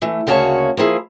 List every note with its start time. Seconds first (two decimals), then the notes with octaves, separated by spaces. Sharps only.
0.02 E3 A3
0.27 D2 C#3 A#3 F#4 C#5 A5
0.77 F3 A#3 E4 G#4